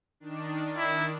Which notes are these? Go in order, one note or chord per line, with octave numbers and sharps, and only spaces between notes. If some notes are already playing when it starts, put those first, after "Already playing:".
D#3 D4
E4